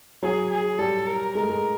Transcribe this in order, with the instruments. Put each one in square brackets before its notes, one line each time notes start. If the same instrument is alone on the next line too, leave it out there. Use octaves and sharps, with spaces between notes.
[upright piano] F#3 [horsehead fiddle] G#4
[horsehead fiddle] G#4
[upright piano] G3 [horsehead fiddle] A4
[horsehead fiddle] A#4
[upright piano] G#3 [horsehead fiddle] A#4
[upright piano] A3
G#3